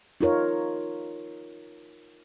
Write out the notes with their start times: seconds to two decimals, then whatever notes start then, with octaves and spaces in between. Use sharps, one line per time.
0.21 D#4 F4 A#4 C#5